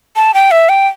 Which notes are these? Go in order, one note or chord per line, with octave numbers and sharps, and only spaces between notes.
A5
G5
E5
G5